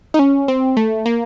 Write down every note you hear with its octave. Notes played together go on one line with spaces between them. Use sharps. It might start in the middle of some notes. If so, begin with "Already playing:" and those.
D#4
C#4
C4
A3
A#3